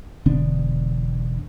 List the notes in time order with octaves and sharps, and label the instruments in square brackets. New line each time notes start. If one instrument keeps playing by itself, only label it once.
[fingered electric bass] E1 D3 B3 D4